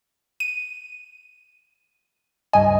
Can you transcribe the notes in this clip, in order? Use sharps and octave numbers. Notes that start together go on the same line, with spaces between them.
D#7
C#2 G2 D#5 G#5